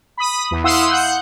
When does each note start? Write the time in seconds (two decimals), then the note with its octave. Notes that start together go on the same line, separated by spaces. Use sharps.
0.17 B5 D#6
0.51 E2
0.64 E4 F5 F#5 C6 D#6 E6
0.91 F#5 F#6 G6